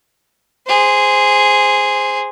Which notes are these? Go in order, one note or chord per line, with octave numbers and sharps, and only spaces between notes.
G#4 C5